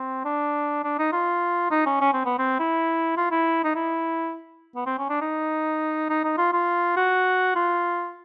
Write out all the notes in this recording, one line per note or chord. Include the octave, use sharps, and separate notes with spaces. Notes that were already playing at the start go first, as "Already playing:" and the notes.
Already playing: C4
D4
D4
D#4
F4
D#4
C#4
C#4
C4
B3
C4
E4
F4
E4
D#4
E4
B3
C4
C#4
D4
D#4
D#4
D#4
F4
F4
F#4
F4